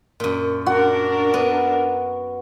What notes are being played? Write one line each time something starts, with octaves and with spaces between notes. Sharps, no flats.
F#2 A#2
D4 F#4 A#4
B3